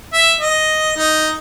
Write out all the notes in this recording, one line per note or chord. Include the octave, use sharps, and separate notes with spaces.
E5
D#5
D#4